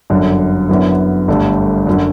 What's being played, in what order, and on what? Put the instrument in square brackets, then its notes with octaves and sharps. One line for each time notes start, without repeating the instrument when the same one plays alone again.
[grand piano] G1 F#2 D3
F#2 D3 F#3 B3 E4
G1 G2 D3 A3
F#2 D3 F#3